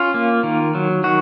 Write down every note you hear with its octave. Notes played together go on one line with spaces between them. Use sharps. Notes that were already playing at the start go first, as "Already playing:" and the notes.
Already playing: C#4 F4
A#3
D#3
F#3
D#3 F#4